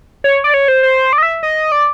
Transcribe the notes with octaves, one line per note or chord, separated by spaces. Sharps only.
C#5
D5
C#5
C5
C5
D5
D#5
E5
D#5
D5